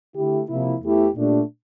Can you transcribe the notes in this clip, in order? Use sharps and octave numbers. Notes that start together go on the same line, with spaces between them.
D3 A3 E4 G4
C3 F3 A#3 E4
E2 E3 A3 E4 G4
A#2 A3 D4 G4